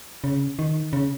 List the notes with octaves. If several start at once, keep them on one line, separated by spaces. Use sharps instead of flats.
C#3
D#3
C#3